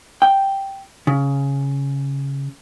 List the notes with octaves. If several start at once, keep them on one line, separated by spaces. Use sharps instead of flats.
G5
C#3